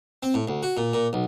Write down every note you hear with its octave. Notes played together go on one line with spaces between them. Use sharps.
C4
A2
D2
F#4
A#2
A#2
B1